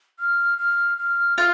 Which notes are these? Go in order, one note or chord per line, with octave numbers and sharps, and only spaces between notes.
F6
F6
F6
F4 F6